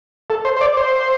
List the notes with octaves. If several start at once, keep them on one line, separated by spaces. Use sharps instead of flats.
A4
C5
C5
D5
C5